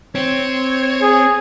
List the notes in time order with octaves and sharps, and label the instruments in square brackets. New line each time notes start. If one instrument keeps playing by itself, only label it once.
[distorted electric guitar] C4 [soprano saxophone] C#5
[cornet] G#4